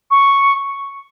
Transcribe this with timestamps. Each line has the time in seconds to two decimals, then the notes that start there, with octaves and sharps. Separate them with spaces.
0.11 C#6